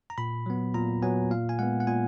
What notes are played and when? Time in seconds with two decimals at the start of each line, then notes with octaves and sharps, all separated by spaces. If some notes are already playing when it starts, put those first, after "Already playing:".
0.10 A#5
0.18 A#2 B5
0.46 F#3 B3
0.74 A#2 A#5
1.02 F#3 B3 G#5
1.31 A#2 F5
1.49 G#5
1.59 G#3 B3 F#5
1.80 F#5
1.87 A#2 G#5